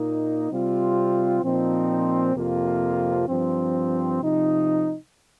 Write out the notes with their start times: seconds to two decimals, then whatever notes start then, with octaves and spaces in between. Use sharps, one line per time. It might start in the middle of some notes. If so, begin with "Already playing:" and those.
Already playing: A#2 A#3 D#4
0.50 C3 G3 C4 F4
1.42 A#2 F3 C4 D#4
2.35 F2 C3 F3 A#3 F4
3.28 G2 F3 C4
4.21 C3 F3 D#4